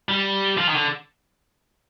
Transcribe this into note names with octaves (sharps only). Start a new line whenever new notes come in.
G3
F3
D#3
D3